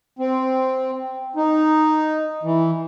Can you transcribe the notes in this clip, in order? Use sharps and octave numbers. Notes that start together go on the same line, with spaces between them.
C4
D#4
E3